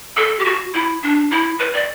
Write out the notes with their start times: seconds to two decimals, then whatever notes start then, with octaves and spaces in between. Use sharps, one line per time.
0.17 A4
0.39 G4
0.45 F#4
0.73 E4
1.02 D4
1.31 E4
1.59 B4
1.73 D5